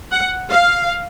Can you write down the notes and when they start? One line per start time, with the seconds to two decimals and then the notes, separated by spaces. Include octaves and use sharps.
0.10 F#5
0.50 F5